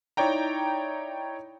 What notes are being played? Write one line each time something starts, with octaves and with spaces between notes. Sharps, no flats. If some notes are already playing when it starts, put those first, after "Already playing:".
D#4 E4 C#5 D5 G5 A#5